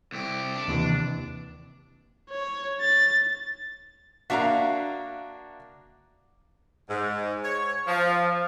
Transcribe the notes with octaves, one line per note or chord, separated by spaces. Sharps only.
C2 G4
D4
D#2 C3 E3
C#5
A6
A#3 D4 F#4 E5 F5 A#5
G#2
C#5
F3